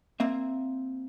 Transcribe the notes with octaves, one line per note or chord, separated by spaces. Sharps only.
A#3 C4 E5